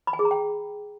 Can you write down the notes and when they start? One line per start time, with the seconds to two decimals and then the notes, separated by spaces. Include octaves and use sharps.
0.07 B5
0.13 G#5
0.19 G#4
0.25 A#5
0.31 G5